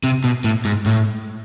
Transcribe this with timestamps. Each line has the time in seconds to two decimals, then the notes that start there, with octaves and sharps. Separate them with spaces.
0.04 C3
0.24 B2
0.44 A2
0.65 G#2
0.86 A2